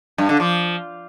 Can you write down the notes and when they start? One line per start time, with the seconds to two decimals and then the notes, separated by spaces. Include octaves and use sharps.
0.18 G2
0.29 D3
0.40 F3